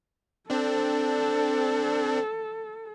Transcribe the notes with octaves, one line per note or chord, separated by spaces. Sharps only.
C4 D4 A4